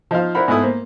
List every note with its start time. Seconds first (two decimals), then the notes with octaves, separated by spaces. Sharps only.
0.11 F3 D#4 C5 F5
0.35 D4 E4 A#4 C5 F#5 B5
0.48 G#2 A3 B3 E4 D#6
0.61 A#3 C5